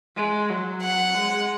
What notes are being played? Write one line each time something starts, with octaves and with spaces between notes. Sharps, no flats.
G#3
F#3
F#5
G#3